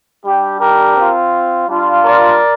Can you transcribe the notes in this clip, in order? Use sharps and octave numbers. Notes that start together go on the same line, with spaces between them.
G3 D4 G4
G4 A#4
C4 F4
G3 D4 F4
A#4 D5